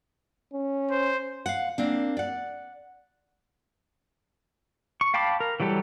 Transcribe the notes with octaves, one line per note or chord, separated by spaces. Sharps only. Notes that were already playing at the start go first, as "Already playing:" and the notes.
C#4
C5
F5 F#5
A#3 C4 D4
D5 F#5
C#6
F5 G5 A5 B5 D6
A#4
E3 F#3 G3 G4 A4